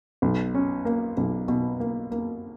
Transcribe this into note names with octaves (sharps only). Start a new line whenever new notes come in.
B1
C#4
A#3
B1
B2
A#3
A#3